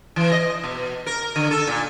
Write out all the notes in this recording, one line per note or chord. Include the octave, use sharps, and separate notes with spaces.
E3
D#5
B2
A#4
D3
A4
A#2